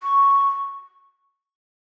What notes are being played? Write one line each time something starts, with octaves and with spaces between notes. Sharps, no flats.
C#6